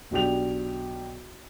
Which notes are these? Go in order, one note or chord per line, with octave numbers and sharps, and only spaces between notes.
B1 D4 G4 F7